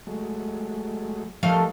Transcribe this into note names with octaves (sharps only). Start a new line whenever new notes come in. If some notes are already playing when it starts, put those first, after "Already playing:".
F#3 G#3 A3
F3 G3 A3 D#4 A#4 F5